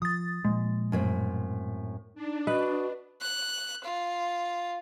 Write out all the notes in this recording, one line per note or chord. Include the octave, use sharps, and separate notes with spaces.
F3 D#6 A6
A#2 F3 G#3
F#2 A2 C4
D4 D#4
F#4 B4 D#5
F#6
F4